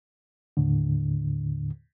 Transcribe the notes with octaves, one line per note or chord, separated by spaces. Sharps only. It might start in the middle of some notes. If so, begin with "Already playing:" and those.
D#2 A2 D3